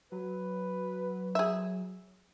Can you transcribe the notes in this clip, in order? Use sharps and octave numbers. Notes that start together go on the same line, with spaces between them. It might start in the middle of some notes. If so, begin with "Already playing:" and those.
F#3 B4
G#4 E5